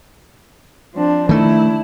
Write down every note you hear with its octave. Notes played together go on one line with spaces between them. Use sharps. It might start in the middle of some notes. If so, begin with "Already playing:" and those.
F3 C4 D4
D#3 A3 D4 E4